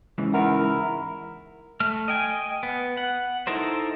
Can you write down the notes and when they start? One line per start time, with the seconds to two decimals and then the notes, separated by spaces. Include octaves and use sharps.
0.18 G#2 C#3 E3
0.34 E4 A#4 F#5
1.80 A3 F6
2.08 D#5 G5 G#5
2.63 B3
2.97 F#5
3.47 D#4 E4 A4 A#4 C5